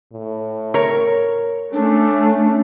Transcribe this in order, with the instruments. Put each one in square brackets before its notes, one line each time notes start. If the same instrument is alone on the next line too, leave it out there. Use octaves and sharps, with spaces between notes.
[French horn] A2
[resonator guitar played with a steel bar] A#4 C#5
[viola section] A3 [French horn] C#4 [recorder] D4